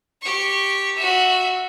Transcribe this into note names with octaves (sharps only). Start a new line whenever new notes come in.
G4 C#6
F#4 E5